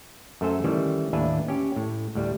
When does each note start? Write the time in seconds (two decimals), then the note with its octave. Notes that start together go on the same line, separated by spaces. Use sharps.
0.41 F#2 A3 A4 C5 G#5
0.64 D#3 E3 G3 A3 C#4
1.13 D#2 A2 D4 B4 E5 G#5
1.48 C#4 G4
1.76 A2
2.15 D2 A2 G3